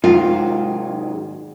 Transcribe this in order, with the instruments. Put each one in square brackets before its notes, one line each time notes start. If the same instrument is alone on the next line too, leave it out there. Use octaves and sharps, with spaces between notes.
[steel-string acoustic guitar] G#2 [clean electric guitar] C3 D#3 F#3 [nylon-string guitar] F4